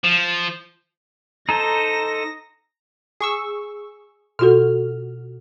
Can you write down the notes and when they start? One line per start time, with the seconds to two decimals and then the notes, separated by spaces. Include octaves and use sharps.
0.04 F3
1.49 D#4 A4 C5 A#5 A#6
3.20 G#4 C#6 E6
4.39 B2 F4 F#4 A4 F6